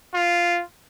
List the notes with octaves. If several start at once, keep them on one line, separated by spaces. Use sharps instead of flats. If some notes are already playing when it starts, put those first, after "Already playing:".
F4